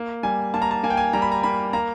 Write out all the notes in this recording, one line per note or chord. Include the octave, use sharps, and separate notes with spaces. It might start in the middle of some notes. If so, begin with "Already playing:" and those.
Already playing: A#3
G3 G#5
A#3 A5
A#5
A5
A#3 G#5
G5
G#5
G3 A#5
B5
A#5
A#3 B5
A#3 A#5